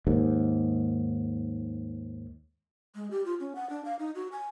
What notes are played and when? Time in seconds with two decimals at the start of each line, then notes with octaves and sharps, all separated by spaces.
0.07 D#2 G#2
2.95 G#3
3.11 G4
3.25 F4
3.40 C#4
3.56 F#5
3.70 D4
3.85 F5
3.99 D#4
4.15 F#4
4.32 G#5